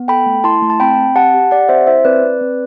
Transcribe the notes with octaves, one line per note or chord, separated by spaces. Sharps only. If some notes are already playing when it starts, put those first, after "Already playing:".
Already playing: B3
A4 G5 B5
A3
E4 A5 C6
A3
A5
C4 G5 B5
C4
G4 F#5 A5
G4
G4 D5 F#5
C4 C5 E5
E4 C5 E5
C4 B4 D5
C4
C4